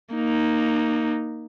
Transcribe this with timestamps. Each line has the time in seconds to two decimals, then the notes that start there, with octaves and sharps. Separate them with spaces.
0.15 A#3 D#4